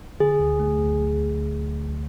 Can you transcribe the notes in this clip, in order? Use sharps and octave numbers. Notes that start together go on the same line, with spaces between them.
D3 G#4
D2
A3
D2